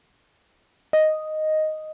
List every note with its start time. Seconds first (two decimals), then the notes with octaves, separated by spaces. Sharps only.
0.93 D#5